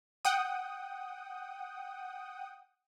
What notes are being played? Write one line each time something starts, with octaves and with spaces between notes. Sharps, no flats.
F#5 G5 D#6